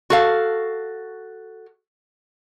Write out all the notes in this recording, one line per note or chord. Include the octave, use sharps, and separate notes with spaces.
F#4 A4 F5